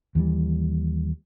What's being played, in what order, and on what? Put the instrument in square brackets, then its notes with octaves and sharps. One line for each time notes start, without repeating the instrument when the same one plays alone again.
[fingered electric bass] D#2 E3 F3 G3